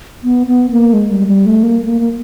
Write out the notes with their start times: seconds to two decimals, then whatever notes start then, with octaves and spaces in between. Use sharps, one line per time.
0.24 B3
0.47 B3
0.70 A#3
0.93 G#3
1.11 G3
1.28 G3
1.46 A3
1.63 A#3
1.86 A#3
2.01 A#3